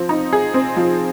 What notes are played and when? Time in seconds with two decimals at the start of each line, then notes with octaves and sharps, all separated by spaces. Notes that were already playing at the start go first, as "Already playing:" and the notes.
Already playing: F3 C4
0.09 D#4
0.33 G#4
0.54 C4
0.77 F3